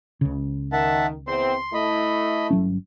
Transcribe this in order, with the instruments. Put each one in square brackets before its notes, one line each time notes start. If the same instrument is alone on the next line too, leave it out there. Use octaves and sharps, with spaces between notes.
[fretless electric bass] C#2 C#3
[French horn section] D#3 [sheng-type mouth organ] E5 F#5 A5
[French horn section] E2 C4 [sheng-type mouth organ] C6
[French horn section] A3 E4 [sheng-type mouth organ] D#5 B5
[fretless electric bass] G1 F#3 C#4